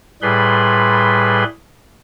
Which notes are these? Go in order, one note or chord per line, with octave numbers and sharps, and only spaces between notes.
A2 G3 G#4 B4 B5 C6